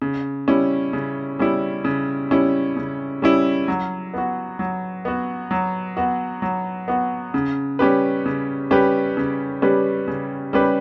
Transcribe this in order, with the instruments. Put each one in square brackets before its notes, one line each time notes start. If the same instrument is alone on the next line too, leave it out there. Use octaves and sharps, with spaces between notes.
[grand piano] C#3
G3 C#4 E4
C#3
G3 C#4 E4
C#3
G3 C#4 E4
C#3
G3 C#4 E4
F#3
B3 F#4
F#3
B3 F#4
F#3
B3 F#4
F#3
B3 F#4
C#3
G3 C#4 G4 B4
C#3
G3 C#4 G4 B4
C#3
G3 C#4 G4 B4
C#3
G3 C#4 G4 B4